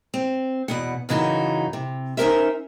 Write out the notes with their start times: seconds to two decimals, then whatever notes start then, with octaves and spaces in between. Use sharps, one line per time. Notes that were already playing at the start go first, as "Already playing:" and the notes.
0.14 C4
0.68 E2 B2 F#5
1.09 F#2 C#3 E3 D#4 F#4
1.73 C3
2.17 C#4 D#4 G4 A#4 C5 E5